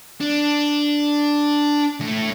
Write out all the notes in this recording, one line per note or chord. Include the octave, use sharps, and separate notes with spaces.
D4
A2